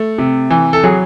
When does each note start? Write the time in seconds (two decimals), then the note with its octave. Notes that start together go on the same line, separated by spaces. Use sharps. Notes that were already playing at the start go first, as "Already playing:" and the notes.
Already playing: A3
0.18 C3
0.50 E3
0.73 A4
0.84 F#3 G#4